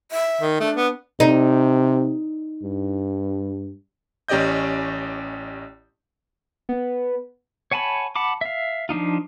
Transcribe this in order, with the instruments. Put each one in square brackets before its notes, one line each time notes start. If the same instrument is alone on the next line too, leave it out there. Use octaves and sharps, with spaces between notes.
[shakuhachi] E5
[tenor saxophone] D#3
[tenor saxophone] A3 [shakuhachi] D4
[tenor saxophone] B3
[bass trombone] C3 [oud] D#4
[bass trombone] G2
[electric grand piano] A1 C#4 G4 D5 D#5 G6
[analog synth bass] B3
[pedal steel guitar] C#5 F#5 G#5 A5 B5
F#5 A5 B5 D6
E5 F5
F3 D4 D#4 F4